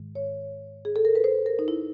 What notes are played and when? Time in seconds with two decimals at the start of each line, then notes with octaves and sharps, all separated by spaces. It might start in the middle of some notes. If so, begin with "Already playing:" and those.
Already playing: G#2 D#3 G#3
0.15 C#5
0.85 G#4
0.96 A4
1.05 A#4
1.15 B4
1.24 C5
1.46 A#4
1.59 D#4
1.68 E4